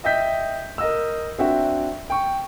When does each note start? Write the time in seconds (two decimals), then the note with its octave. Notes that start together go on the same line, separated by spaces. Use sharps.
0.04 D#5 E5 G5 G6 B6
0.78 A#4 D#5 E6
1.38 C4 D4 F#4 E5 F#5 G5
2.10 G5 C#6